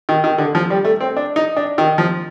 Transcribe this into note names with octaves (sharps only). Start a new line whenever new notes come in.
D#3
D#3
D3
F3
G3
A3
C4
D4
D#4
D4
D#3
F3